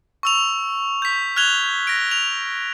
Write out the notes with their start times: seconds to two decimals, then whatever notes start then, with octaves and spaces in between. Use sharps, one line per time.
0.23 C#6 E6 F7
1.02 G6 B6
1.36 F6 F#6 G#6 F7 G7
1.87 A#6 D7
2.11 F7